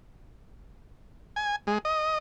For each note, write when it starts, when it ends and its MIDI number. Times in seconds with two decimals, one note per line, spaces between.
1.36 1.56 80
1.67 1.78 56
1.85 2.18 75